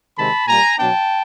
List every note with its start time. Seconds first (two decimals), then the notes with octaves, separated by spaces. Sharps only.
0.17 C3 D#3 G#3 C4 A5 B5
0.47 A#2 G3 A#3 G#5 A#5
0.78 B2 F#3 B3 D4 G5 A5